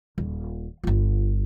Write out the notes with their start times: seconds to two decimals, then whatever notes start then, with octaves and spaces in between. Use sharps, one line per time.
0.18 D#1
0.84 G1 F4